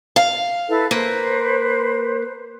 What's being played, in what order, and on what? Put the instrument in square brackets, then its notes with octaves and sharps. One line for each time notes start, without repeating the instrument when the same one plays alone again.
[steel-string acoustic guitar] F5
[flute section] E4 A4 B4
[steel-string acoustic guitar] A#3 [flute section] B4 C5